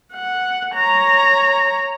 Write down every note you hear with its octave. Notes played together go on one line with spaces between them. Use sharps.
F#5
C#5 A#5